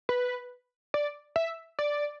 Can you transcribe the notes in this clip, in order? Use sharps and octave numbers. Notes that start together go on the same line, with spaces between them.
B4
D5
E5
D5